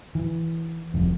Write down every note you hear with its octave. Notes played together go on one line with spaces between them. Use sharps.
E3
F1 C2 F2